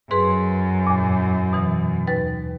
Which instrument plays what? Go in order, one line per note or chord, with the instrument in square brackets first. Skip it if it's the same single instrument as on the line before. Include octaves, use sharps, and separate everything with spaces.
[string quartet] F#2 [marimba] G#4 B4 C6
[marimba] E2 A#2
B2 E3
D#2 B4 A6